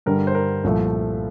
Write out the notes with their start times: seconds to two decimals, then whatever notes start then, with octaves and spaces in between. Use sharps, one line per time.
0.06 G2 D3 G3 A#4
0.27 C5
0.35 A#4
0.64 C2 A#2 F3 A3